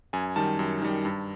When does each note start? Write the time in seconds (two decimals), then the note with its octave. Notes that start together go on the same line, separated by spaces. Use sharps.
0.13 F#2 G#5
0.36 D#3 G3 A5
0.59 F#2
0.82 D#3 G3
1.05 G2